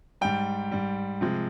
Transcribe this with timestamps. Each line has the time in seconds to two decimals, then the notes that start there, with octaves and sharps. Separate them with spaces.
0.21 G#2 G3 G5
0.72 G#2 G3
1.21 C3 F3 G#3